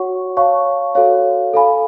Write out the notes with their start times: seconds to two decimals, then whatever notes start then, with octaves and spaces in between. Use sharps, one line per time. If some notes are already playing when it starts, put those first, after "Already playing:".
Already playing: F#4 C#5 F#5 C#6
0.37 C#5 F5 A5 C#6
0.95 F#4 A4 C#5 F5
1.54 A4 F5 G#5 B5